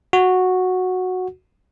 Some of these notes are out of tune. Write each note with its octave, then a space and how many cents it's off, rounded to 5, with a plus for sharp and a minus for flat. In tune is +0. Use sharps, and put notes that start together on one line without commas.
F#4 -5